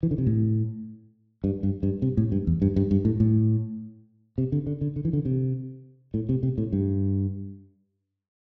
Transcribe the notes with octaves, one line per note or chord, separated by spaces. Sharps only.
E3
D3
C3
A2
G2
G2
G2
C3
A2
G2
E2
G2
G2
G2
A2
A2
C3
D3
D3
D3
D3
E3
D3
C3
A2
C3
C3
A2
G2